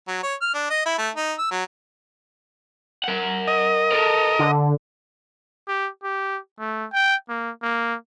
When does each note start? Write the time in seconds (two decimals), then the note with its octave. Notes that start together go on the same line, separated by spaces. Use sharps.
0.08 F#3
0.23 C#5
0.42 F6
0.54 D4
0.70 D#5
0.86 E4
0.98 A3
1.15 D#4
1.39 E6
1.51 F#3
3.04 A#4 F#5
3.48 D#5
3.91 A4 A#4
4.39 D3
5.68 G4
6.03 G4
6.59 A3
6.93 G5
7.29 A#3
7.62 A#3